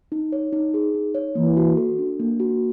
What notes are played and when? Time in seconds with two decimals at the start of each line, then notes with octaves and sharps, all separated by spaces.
0.12 D#4
0.32 C#5
0.53 D#4
0.74 G#4
0.94 D#4
1.15 C#5
1.35 E3 A#3
1.57 F#4
1.77 A4
1.98 D4
2.20 A#3
2.40 F#4